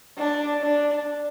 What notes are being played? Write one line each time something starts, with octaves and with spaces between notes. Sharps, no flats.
D4
D4